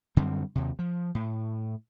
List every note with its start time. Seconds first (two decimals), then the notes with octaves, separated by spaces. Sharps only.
0.16 F#2 D3 G3 C4
0.55 D#2 C3
0.79 F3
1.15 A2